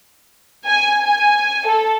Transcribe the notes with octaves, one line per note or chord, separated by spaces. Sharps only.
G#5
G#5
A4